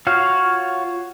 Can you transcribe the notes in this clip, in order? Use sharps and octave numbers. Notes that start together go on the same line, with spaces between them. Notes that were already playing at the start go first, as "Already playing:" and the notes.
F4 F#4 C#5 F5